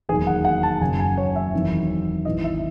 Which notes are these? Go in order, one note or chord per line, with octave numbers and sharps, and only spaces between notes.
E1 D#2 D#3 F#3 G#4
F#5
F#5
A5
F#1 F#2 C#3 F#3 G#5
G#5
C#5
E5
E1 E2 D#3 F#3 C4
G#1 G#2 E3 D#5
E5